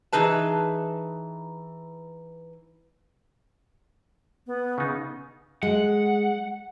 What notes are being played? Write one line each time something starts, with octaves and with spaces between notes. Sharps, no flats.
E3 D#4 G#4 B4 A5
B3
C#3 D#4
G#3 F#5